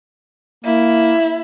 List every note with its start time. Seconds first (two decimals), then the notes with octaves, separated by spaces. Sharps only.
0.64 A#3 E4